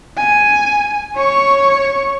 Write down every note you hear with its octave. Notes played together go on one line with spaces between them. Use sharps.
G#5
C#5 C#6